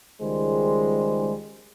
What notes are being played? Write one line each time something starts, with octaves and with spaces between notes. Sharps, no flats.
C#2 D#3 G3 G#3 C5